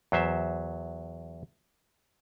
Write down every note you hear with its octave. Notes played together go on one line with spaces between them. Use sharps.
E2 F#3 C5 E5